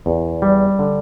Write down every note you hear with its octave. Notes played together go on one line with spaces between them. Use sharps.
E2
G3
D3